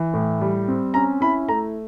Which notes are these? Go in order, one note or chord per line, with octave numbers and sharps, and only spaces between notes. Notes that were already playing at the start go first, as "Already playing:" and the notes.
Already playing: E3
A2
G3
C4
C#4 A#5
E4 B5
A3 A#5